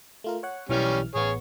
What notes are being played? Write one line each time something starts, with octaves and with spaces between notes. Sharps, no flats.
A3 F4 A#4
C#5 F#5
B1 E3 G3 C#4 F6
A1 B3 G#4 C#5 C#6